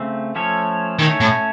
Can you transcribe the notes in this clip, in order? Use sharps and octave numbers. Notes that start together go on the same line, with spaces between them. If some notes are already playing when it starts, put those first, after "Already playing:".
Already playing: C#3 A3 C4
F3 A3 C#4 A4 C#5
D#3 A3 C#4 A4 C#5
A2